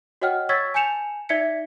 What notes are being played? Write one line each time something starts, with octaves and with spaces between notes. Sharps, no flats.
F#4 C#5 D#5 F#5 G5 F6
C#5 C#6 E6 G#6 A6 B6
G#5 A5 G6 C#7 E7 F7
D#4 D5 E5 G#6 B6 C#7